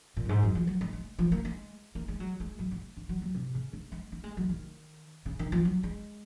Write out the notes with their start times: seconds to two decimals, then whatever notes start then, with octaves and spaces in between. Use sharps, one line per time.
0.17 A#2
0.25 F#2
0.29 G#2
0.43 F#2
0.55 F3
0.67 F#3
0.81 G#3
0.93 G#3
1.18 F3
1.32 A#3
1.45 G#3
1.95 A#3
2.08 G#3
2.20 F#3
2.40 G#3
2.59 F#3
2.71 G#3
2.97 G#3
3.09 F#3
3.22 F#3
3.35 C3
3.54 C#3
3.73 A#3
3.92 G#3
4.12 A#3
4.24 G#3
4.37 F#3
4.49 D#3
5.26 C#3
5.39 D#3
5.52 F3
5.65 F#3
5.83 G#3